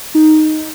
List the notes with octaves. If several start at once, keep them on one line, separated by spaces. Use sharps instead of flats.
D#4